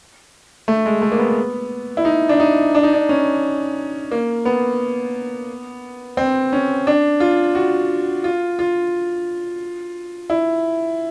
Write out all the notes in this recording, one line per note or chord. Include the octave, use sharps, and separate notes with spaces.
A3
G#3
A3
A#3
B3
E4
D#4
D4
D#4
D4
D#4
D4
C#4
A#3
B3
C4
C#4
D4
F4
F#4
F4
F4
E4